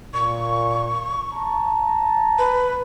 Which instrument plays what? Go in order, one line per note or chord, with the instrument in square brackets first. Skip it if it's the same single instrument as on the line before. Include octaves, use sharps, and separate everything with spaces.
[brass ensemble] A#2 [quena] C#6
[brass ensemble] A5 A#5
[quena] B4